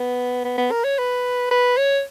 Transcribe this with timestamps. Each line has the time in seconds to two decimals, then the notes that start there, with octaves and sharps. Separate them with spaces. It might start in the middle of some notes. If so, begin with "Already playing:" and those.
Already playing: B3
0.45 B3
0.58 B3
0.71 A#4
0.84 C#5
0.98 B4
1.51 B4
1.77 C#5